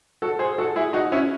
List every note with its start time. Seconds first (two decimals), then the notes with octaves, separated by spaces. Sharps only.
0.22 F#4 A4
0.39 G#4 C5
0.58 F#4 A4
0.76 E4 G#4
0.93 D#4 F#4
1.12 C#4 E4